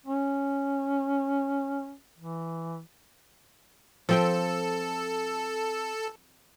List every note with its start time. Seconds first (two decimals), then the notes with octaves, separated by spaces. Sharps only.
0.06 C#4
2.18 E3
4.09 F3 C4 A4 G5